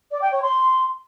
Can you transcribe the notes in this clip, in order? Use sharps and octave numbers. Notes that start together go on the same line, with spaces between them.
D5
G5
C#5
C6